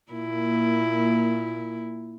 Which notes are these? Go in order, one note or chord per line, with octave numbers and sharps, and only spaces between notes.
A#2 A#3 E4